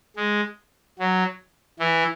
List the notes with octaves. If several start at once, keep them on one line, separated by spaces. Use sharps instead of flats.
G#3
F#3
E3